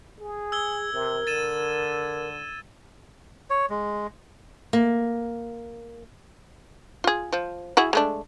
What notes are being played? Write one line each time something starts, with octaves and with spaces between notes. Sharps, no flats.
G#4
E6 G#6 G7
C3 A#4
D3 A6 D#7 E7
C#5
G#3
A#3
F4 G#4
F3
E4 F#4 G#4
G#3 A3 D4